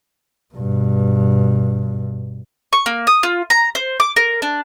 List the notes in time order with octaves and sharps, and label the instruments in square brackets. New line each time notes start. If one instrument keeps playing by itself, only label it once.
[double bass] G2 B2
[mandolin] C#6
A#3
D#6
F4
A#5
C5
D6
A#4
D4